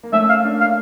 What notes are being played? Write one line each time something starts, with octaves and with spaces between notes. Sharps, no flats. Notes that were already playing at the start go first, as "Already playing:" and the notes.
A#3
A3 C#4 E5
F5
A#3 D4
F5